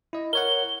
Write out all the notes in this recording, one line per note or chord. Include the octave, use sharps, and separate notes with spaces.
E4 D#5
A#4 C#5 F#5 G7